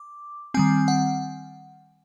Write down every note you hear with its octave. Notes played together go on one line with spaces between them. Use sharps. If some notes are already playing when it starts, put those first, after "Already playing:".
Already playing: D6
D#3 G3 C4 G#5
F#5